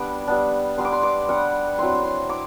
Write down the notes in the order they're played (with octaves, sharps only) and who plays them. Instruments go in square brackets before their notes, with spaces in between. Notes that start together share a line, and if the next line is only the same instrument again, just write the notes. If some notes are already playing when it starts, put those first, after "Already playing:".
Already playing: [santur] G3 B3 D4 D6
G3 B3 D4
G3 B3 D4 C6
D6
C6
D6
G3 B3 D4 F#5
F#3 C4 E4 C6
C6
E4 D6